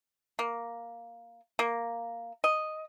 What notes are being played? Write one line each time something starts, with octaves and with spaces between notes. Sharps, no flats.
A#3
A#3
D#5